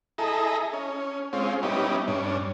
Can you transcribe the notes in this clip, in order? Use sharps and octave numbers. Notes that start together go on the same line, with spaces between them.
E4 G#4 A4 D#5 A#5
C#4
G#3 C4 C#4 F4
G3 B3 C#4 D#4 E4 G4
G2 C#4 D4